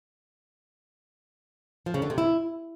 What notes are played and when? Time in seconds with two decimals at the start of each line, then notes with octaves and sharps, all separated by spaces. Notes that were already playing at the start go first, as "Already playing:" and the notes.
1.86 F3
1.94 C#3
2.02 D3
2.10 C3
2.18 E4